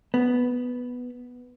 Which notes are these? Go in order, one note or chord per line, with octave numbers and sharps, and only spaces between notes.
B3